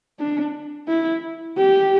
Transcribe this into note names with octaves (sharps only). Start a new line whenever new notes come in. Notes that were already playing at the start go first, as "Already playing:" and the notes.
D4
E4
G4